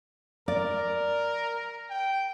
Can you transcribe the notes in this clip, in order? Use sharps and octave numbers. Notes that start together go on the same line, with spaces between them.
A#4 D5
G5